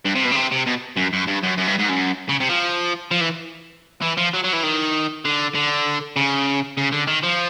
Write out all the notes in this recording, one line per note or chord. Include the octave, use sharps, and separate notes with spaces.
G2
C3
B2
C#3
C3
C3
B2
F#2
F#2
G2
F#2
F#2
G2
G#2
F#2
C#3
C3
F3
F3
E3
E3
F3
F#3
F#3
E3
D#3
D3
D3
C#3
C#3
D3
D#3
F3